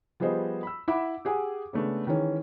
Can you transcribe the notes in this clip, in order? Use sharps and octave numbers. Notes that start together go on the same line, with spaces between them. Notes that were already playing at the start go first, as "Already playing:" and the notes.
F3 G3 B3 G#4 C5 D#5
B5 E6
E4 E5 F#5 B5 D6
G4 G#4 F#5 G#5
C#3 G#3 A3 B3 D4
D#3 E3 G#3 C#4